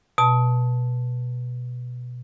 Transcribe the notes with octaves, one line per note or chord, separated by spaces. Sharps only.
B2 A5